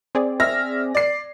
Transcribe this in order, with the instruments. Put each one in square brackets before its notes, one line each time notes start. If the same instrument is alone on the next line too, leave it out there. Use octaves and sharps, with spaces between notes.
[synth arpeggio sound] C4 G#4 D5
[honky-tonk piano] E5 F6 A#6
D5 C7